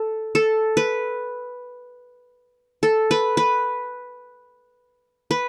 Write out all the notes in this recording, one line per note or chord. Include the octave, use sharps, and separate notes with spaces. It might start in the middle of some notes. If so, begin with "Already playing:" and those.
Already playing: A4
A4
B4
A4
B4
B4
B4